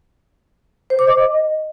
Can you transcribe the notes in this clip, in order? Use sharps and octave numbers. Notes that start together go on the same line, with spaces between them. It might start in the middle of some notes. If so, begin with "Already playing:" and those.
C5
D6
D#5